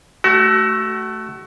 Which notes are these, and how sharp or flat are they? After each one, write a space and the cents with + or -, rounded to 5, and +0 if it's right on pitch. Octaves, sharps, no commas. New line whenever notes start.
A3 +0 F#4 +30